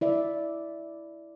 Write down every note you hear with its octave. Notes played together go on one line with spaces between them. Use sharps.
E4 D5 E5